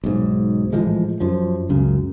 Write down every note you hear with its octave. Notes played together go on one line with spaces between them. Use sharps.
B1 G#2
A2 E3 F3 G#3
F#2 F3
C#2 F#2 C#3